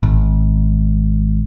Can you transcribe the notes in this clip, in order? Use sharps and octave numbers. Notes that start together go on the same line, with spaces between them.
G#1